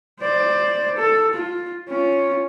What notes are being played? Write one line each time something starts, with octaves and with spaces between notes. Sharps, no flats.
C5 D5
A4
F4
C#4 F4